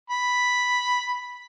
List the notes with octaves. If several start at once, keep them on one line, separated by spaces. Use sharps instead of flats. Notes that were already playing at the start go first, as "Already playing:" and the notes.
B5